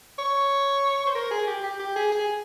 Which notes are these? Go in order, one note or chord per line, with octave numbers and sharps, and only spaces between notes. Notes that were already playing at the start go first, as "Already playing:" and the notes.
C#5
C5
A#4
G#4
G4
G4
G4
G#4
G#4